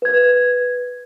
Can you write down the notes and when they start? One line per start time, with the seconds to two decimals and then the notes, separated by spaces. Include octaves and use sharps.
0.02 B4 G#6